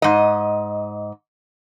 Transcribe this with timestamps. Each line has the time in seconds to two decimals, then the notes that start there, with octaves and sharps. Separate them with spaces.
0.02 G#2 D#5